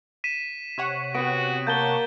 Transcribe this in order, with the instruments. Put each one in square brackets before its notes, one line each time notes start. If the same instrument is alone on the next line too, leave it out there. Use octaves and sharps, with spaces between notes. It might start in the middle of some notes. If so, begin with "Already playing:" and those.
[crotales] B6 D#7 E7
[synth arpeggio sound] C3 C#5 F#5
[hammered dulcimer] B3 G4 [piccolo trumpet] F#4 [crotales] D7
[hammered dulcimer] A#3 [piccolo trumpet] A5 [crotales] G6 A6 G7